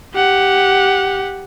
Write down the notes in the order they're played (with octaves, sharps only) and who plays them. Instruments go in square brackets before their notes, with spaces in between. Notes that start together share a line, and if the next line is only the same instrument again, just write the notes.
[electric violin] G4 F#5